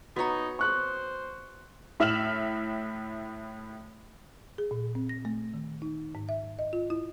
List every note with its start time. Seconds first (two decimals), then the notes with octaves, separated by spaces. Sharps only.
0.16 B3 D#4 F#4 C#5 A#5
0.59 C5 C#6 F#6
2.00 A2 E5 F6 E7 F#7
4.58 G#4
4.71 A#2
4.95 C4
5.09 A#6
5.25 A3
5.54 D#3
5.82 D#4
6.15 G#2
6.29 E5
6.59 D#5
6.73 F4
6.90 E4